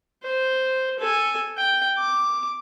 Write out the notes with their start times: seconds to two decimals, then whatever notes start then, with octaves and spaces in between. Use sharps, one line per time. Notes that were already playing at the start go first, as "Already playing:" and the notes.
0.23 C5
0.99 A4 G#5
1.58 G5
1.97 D6